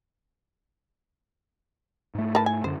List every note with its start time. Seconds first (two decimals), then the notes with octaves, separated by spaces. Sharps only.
2.15 G#2 A3
2.35 A#4 B4 A5
2.46 G#5
2.64 F#2 D3 C5